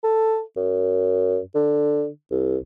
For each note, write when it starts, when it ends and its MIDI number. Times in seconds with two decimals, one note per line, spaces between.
0.04 0.41 69
0.57 1.39 42
1.55 2.07 50
2.31 2.57 36